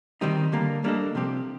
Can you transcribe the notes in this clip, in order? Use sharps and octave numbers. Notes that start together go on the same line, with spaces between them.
D#3 G3 C4 D#4
D3 G3 A#3
G3 A#3 D4 A4 D#5
C3 F3 C4 G4